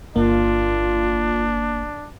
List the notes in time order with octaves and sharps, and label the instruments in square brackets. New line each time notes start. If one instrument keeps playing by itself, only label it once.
[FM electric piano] G1 A#3 [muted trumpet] D4 [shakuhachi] F4